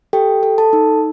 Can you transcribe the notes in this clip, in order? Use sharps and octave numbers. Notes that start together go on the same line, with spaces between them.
G4 A4 G5
A4
A4 A5
D#4